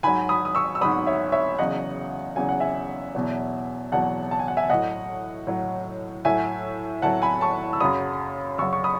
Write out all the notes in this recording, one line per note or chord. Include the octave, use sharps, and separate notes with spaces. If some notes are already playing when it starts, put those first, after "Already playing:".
G#2 F#3 G#5 B5
B5 D#6
D#6
C#6 E6
E6
G#2 F#3 B5 D#6
C#5 E5
C#5 E5
E2 C#3 F#3 D#5 F#5
E2 C#3 F#3 G#5
F#5
E5 G#5
E2 B2 F#3
E2 B2 F#3 F#5 A5
A5
G#5
F#5
E5 G#5
A2 F#3 D#5 F#5
A2 F#3
A2 F#3 E5 G#5
A2 F#3 F#5 A5
G#5 B5
A5 C#6
E6
F#2 C#3 F#3 B5 D#6
F#2 C#3 F#3 C#6 E6
C#6
B5 D#6